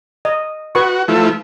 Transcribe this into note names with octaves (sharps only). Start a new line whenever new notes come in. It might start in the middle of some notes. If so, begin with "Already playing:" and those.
D#5
F#4 B4 C#6
F3 A3 E4